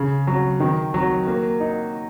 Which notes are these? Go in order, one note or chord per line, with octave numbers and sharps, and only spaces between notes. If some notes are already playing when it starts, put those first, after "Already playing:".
Already playing: C#3
F#3
D#3
F#3
A#3
D#4